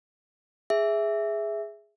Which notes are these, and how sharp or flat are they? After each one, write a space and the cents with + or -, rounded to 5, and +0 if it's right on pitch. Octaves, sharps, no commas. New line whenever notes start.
G#4 +0 E5 +0